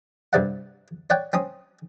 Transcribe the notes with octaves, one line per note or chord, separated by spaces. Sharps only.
G2 C3 D5 F#5
C#5 D5 F#5 G5
C4 C#4 D#6